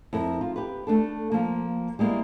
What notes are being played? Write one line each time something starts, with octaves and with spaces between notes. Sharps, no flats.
F2 E4 A#4
F4
G4 B4
A3 D4 A4
F3 A#3
G3 G#3 A#3 B3 E4